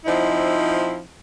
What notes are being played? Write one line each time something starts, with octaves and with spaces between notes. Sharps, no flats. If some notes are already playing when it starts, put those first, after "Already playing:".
F3 C4 D#4 E4